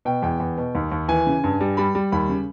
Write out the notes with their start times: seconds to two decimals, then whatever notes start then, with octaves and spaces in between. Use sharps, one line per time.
0.05 B2 G5
0.22 E2 G5
0.40 E2
0.57 B2
0.75 D#2
0.92 D#2
1.08 E3 G#5
1.27 C#3
1.44 G2
1.61 G3
1.77 G3 B5
1.95 G3
2.12 D#2 B5
2.29 C#3